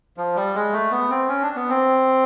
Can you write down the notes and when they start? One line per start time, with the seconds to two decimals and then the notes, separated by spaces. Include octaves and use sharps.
0.17 F3
0.36 G3
0.55 G#3
0.73 A3
0.91 B3
1.10 C4
1.28 C#4
1.42 D4
1.56 B3
1.69 C4